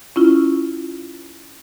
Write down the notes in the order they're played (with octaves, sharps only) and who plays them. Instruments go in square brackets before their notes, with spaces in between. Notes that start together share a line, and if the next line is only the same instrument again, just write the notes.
[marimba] C#4 E4 F4